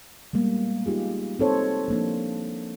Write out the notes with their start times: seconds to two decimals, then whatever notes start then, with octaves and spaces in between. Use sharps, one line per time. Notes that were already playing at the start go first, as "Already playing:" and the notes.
0.33 G3 G#3 A#3 B3
0.86 D#4 F4 G4 G#4
1.39 C4 D#4 A4 C5 C#5
1.88 F3 A#3 D4